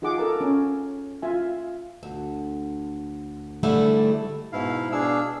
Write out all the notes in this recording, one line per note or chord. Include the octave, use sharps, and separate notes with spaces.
D#4 F4 G#4 F#5 D6
A4 A#4 A5
C#4
F4 E5 G#5
D2
E2 G#2 D3 G3 A3 E4
G#2 B2 E4 F5
B2 D4 G#4 F5 E6